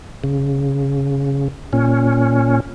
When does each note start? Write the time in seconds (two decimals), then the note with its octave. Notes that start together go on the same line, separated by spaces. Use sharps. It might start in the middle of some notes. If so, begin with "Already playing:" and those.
0.24 C#3
1.73 A#2 C#4